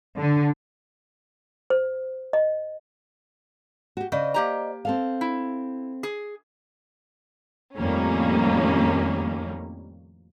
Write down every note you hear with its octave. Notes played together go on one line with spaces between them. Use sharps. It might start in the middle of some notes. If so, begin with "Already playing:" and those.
D3
C5
D#5
F#4 G4
C#3 C5 D5 D#5
A#3 G4 A#5
C4 A4 F5
E4
G#4
F2 A2 D#3 G3 A#3 C#4